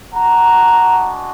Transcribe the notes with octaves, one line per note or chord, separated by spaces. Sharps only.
G#3 D4 F#4 F#5 A#5